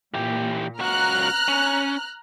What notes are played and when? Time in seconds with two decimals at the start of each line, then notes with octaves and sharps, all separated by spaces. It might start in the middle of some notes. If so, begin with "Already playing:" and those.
0.14 A#2 E3 G4
0.79 C#2 F#4 A#5 F6 F#6
1.48 C#4